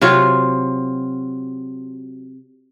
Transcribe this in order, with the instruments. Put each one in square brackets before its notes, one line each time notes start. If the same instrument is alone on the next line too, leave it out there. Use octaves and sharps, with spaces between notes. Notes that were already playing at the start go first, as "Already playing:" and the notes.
[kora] C3 F#3 F4 C#5